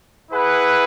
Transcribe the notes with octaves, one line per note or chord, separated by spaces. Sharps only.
E4 G#4 B4 F#5